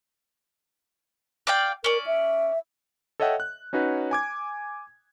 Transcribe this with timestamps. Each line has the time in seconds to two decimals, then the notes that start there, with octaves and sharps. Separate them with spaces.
1.47 D5 F5 G5
1.84 C#4 A#4 D5
2.07 E5
3.20 A4 C#5 D#5 E5 F#5 G5
3.40 F#6
3.73 C#4 D#4 F#4 B4 C#5 F#5
4.11 G#5 D6 G#6